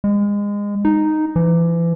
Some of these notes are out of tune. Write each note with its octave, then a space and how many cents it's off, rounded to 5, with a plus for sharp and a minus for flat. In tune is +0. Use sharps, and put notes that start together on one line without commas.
G#3 -25
D#4 -5
E3 +35